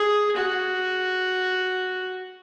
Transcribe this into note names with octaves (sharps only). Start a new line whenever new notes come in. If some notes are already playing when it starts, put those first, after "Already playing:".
Already playing: G#4
F#4